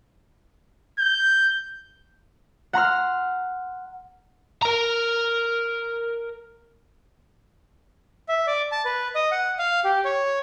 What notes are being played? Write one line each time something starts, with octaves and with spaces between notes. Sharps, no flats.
G6
F#5 A#5 C6 F6
A#4 A#5
E5
D5
A5
B4
D#5
F#5
F5
G4
C#5